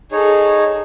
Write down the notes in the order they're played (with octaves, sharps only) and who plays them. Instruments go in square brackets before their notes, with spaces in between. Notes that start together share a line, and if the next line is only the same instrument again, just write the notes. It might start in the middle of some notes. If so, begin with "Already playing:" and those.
[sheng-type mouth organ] D#4 C#5 [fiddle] G#4 A4